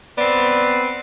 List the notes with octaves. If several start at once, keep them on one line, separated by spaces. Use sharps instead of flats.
B3 C4 D5